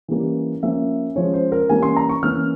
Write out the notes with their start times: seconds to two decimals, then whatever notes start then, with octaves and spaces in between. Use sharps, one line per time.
0.08 E3 G3 A#3 C#4
0.63 F3 A#3 C#4 E5
1.16 F3 G#3 C#4 C#5
1.34 C5
1.52 A#4
1.69 E3 G3 A#3 C#4 G#5
1.83 C6
1.97 A#5
2.09 C#6
2.23 E3 A#3 C#4 F6